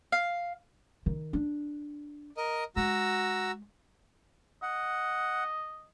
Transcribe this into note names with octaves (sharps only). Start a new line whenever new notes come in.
F5
D#3
D4
A#4 D#5
G#3 F#4 A#5 E6
D#5 F#5